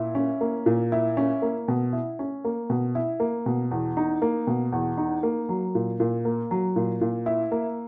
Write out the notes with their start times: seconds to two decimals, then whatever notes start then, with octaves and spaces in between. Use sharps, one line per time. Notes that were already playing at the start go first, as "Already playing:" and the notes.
Already playing: A#2 E4
0.15 C#4
0.41 A#3
0.66 A#2
0.92 E4
1.17 C#4
1.42 A#3
1.68 B2
1.93 E4
2.19 C#4
2.45 A#3
2.70 B2
2.95 E4
3.20 A#3
3.46 B2
3.71 E2
3.97 D#4
4.22 A#3
4.47 B2
4.72 E2
4.98 D#4
5.23 A#3
5.49 F#3
5.75 A#2
6.00 A#2
6.25 A#3
6.51 F#3
6.76 A#2
7.01 A#2
7.26 E4
7.52 A#3